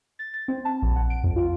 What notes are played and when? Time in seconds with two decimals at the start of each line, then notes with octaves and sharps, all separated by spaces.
0.19 A6
0.34 A6
0.48 C4
0.65 A5
0.82 A#1
0.96 F#5
1.10 D7
1.23 F2
1.36 F4